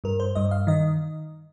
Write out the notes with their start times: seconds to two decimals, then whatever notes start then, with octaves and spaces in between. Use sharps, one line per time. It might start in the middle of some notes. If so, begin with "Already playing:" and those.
0.04 G2 A#4
0.20 C5
0.35 G2 D#5
0.51 F5
0.67 D#3 D#5